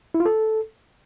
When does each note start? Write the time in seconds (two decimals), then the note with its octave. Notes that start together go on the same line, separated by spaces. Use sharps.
0.15 E4
0.20 F4
0.26 A4